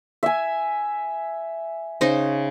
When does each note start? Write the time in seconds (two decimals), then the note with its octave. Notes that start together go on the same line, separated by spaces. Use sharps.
0.23 E5 G#5
2.01 C#3 D#4 C5